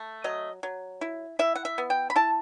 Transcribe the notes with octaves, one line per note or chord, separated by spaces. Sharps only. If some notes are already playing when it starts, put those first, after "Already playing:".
Already playing: A3
F#3 D#5
F#3
E4
E4 E5
F#5
E5
B3
G5
B5
E4 A5